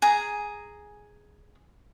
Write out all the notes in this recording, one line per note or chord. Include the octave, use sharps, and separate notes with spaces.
G#4 A#5